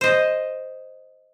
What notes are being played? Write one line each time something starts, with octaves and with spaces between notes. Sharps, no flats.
C5 D#5